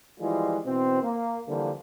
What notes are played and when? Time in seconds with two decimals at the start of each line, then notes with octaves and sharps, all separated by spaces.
0.20 E3 F3 G3 G#3 F4
0.65 B2 E3 C4
1.02 A#3
1.47 D3 E3 F3 G3 A#3